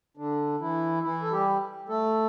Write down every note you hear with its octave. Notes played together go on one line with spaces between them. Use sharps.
D3 D4
E3 E4
E3 E4
A4
G3 G4
A3 A4